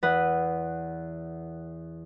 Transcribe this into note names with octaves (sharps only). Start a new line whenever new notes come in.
E2 B4 F#5